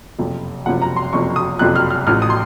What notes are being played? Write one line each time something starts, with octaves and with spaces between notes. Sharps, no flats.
F#1 F2 C3 F3
F#1 F2 C3 F3 F#5
A#5
C6
F#1 F2 C3 F3 C#6
D#6
F#1 F2 C3 F3 F#6
F6
F6
A1 A2 F3 F6
D#6
C6